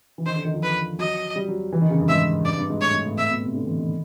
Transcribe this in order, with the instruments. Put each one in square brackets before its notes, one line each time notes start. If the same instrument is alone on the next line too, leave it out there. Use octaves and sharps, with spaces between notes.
[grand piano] E3
[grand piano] D#3 [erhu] C5
[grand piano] D3
D#3
F3
[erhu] B4
[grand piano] F#3 [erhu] D#5
[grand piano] G3
F#3
E3
D#3
C#3
G2
[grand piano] G#2 [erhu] E5
[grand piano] G2 [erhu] D5
[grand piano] G2
G#2
[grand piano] A2 [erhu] C#5
[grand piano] G#2
A2
[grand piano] A2 [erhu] E5
[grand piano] B2
C3
D3
E3
D#3